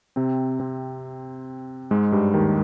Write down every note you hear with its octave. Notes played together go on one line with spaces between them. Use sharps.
C3 C4
C3 C4
G#2 G#3
G2 G3
D#2 D#3